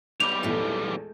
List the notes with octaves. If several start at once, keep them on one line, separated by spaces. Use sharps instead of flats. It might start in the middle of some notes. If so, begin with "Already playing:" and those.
B1 G3 B5 D6 G6 F7
A#1 E2 G#3 A3